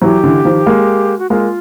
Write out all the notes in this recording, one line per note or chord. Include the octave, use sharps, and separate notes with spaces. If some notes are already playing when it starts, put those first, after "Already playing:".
E3 F#3 G4
D3 E3
D#3 F3
G#3 A#3
F#4
G#3 A#3 F4